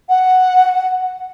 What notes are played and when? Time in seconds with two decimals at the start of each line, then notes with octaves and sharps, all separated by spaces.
0.09 F#5